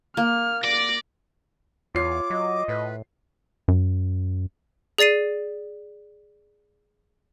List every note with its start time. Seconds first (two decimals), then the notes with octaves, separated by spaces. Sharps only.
0.17 A#3 F6
0.64 D5 A#6
1.95 E2 F4 C#5 D6 C7
2.30 F#3 D#5
2.68 A2 B4
3.68 F#2
4.98 G#4 D5 A6 C7 D#7